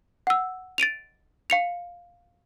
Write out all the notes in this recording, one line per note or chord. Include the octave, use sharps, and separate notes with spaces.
F#5 E6
A6 D7 D#7 F7
F5 C#7 F7